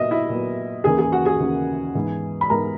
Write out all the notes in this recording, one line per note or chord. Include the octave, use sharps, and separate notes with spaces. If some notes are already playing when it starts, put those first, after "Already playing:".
Already playing: A#2 F#3 B3 D#5 E5 D#6
E4 E5
A#2 F#3 B3
D#2 C#3 E3 A#3 G#4 G#5
G#4 G#5
F#4 F#5
G#4 G#5
D#2 C#3 E3 A#3
G#2 E3 G#3 B3
B5
G#2 E3 G#3 B3 A#4 A#5